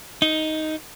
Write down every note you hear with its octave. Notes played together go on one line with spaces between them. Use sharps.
D#4